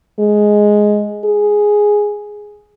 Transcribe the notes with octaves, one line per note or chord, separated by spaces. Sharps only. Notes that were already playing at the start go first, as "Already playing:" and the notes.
G#3
G#4